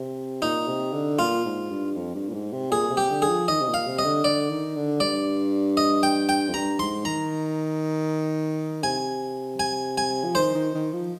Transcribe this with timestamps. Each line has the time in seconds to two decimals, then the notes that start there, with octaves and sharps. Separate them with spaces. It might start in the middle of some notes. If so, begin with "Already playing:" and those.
Already playing: C3
0.42 A#2 D#4
0.68 C3
0.93 D3
1.19 A#2 F4
1.45 G#2
1.70 G2
1.96 F2
2.15 G2
2.29 A#2
2.34 G#2
2.52 C3
2.71 A#2 G#4
2.90 C3
2.97 G4
3.10 D3
3.22 G#4
3.29 F3
3.48 D#3 D#5
3.61 C3
3.68 A#2
3.74 F5
3.87 C3
3.99 D#5
4.05 D3
4.24 D3 D5
4.49 D#3
4.76 D3
5.00 G2 D5
5.77 D#5
6.03 G5
6.29 G5
6.48 F2
6.54 G2 A#5
6.79 G#2 C6
7.05 D#3 A#5
8.83 C3 G#5
9.59 G#5
9.98 G#5
10.25 F3
10.35 D#3 C5
10.55 D#3
10.74 D#3
10.93 F3